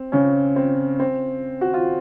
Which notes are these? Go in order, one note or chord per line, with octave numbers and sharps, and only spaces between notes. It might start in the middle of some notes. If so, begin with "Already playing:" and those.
Already playing: C4
C#3 C#4
C4
C4
F#4
F4